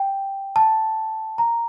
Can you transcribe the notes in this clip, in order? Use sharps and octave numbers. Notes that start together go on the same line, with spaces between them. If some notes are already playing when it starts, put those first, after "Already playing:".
Already playing: G5
A5
A#5